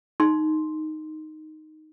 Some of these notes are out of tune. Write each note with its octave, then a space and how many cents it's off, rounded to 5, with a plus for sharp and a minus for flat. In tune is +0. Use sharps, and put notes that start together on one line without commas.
D#4 +0 C6 +0